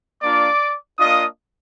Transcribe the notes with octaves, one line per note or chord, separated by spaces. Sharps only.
A#3 D4 F4 D5 D6
A#3 D4 F4 D#5 D#6